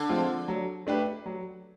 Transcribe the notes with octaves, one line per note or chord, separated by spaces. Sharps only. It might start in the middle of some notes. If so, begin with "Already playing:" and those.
Already playing: D3
F3 G#3 C4 F4
F#3
A3 D4 G4 B4
F#3